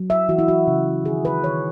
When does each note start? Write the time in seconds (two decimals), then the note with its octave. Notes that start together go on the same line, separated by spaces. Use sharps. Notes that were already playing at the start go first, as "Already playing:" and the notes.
Already playing: F#3
0.10 E5
0.29 E3 F#4
0.39 E4
0.48 F#4
0.67 C#3
1.05 D#3 G#4
1.25 B4
1.43 D#3 C#5